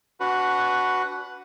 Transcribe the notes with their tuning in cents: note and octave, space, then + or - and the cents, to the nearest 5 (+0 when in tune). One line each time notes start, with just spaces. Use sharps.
D4 -40 F#4 +0 B4 +5